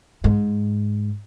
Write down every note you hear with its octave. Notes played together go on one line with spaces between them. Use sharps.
G#2